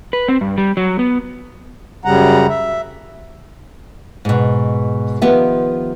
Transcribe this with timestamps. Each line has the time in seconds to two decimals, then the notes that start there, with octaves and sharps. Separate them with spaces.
0.13 B4
0.28 C4
0.41 G2
0.58 G3
0.77 F#3
0.99 B3
2.05 F#2 C#3 G3 F#5 A#5
2.50 E5
4.25 G#2 B2
5.22 D#3 F3 B3 G4 E5